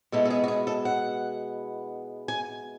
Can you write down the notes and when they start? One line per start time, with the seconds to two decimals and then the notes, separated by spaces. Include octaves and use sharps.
0.12 B2 G#3 B3 E4 A4
0.26 A4
0.30 G#4
0.44 F#4
0.48 G#4
0.67 A4
0.85 F#5
2.28 G#5